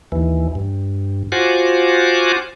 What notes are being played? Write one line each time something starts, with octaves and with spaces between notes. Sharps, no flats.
D#2 E3
G2
F4 F#4 C5 F#5 G#5 D6